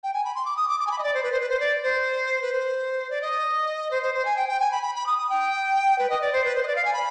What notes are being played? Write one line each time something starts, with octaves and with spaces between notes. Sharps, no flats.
G5
G#5
B5
C6
D6
D#6
D6
D6
G#5
B5
D#5
D5
C5
B4
C5
B4
C5
D5
C5
B4
C5
D5
D#5
C5
C5
C5
G#5
G5
G5
G#5
B5
B5
B5
D#6
D#6
G5
B4
D#5
D5
C5
B4
C5
D#5
D5
F5
G#5
B5